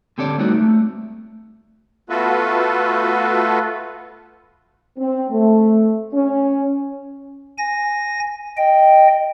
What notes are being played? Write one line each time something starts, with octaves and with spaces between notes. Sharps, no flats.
D3 C4 G4 A4 C#5 D5
G3 A3 B3 C4 D#4 F#4
A3
A3 B3 F4 F#4 A4 B4
C4
A3
C#4
G#5 A#6
D#5 G5